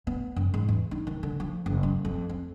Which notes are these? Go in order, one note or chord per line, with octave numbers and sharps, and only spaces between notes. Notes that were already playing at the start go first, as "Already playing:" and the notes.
B3
F#2
G#2
E2
D#4
D#3
D3
F3
F#1
F#2
F2
C4